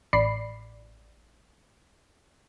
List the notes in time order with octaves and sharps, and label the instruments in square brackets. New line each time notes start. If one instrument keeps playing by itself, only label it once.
[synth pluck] A1 D5 B5 C7